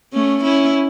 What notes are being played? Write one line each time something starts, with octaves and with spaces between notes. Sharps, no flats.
A3 C#4
C#4 E4